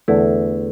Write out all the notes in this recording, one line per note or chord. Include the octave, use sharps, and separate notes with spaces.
E2 D3 A3 E4